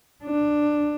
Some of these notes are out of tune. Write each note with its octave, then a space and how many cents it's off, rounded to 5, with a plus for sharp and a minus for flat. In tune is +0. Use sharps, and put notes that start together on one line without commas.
D4 +10